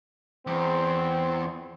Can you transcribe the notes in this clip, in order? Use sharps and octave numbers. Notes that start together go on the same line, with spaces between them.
E2 C4